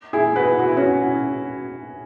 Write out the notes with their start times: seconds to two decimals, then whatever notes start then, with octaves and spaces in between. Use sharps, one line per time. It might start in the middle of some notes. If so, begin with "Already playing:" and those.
0.13 E4 G#4
0.36 F#4 B4
0.59 F#4
0.69 E4
0.77 C#4 F#4